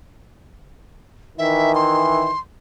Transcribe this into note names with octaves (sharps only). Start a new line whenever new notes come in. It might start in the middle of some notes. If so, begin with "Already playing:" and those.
D#3 E3 E5
C6